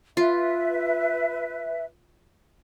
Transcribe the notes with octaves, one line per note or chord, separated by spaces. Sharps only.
F4 B4 E5